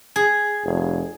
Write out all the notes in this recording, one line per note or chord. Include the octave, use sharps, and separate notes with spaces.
G#4
F1